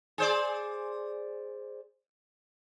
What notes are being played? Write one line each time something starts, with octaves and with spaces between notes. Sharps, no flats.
G#4 C5 D5